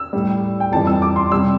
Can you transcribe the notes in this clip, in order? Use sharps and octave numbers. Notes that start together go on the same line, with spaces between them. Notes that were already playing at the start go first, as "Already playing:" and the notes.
Already playing: E6
A2 G3
G5
F2 E3 G3 A5
E6
D6
C6
C3 G3 E6